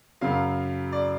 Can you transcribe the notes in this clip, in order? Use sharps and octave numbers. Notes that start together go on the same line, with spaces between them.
F#2 C#3 F#3 F5
D5